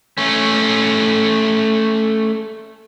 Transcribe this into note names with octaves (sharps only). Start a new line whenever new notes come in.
A3 C#4